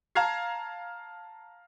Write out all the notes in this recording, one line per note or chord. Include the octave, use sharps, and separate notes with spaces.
F5 A5 A#5 F6 G#6 C7